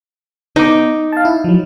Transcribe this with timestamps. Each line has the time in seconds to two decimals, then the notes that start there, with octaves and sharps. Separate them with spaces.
0.56 B3 D#4 D6
1.12 F5 A5
1.25 E4
1.44 F3 F#3